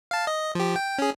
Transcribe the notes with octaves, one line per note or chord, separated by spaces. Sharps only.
F5 A5
D#5
F3 G4
G5
C#4 G#4